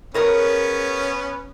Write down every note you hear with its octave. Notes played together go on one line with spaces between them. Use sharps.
B3 C#4 G#4 A#4 C#5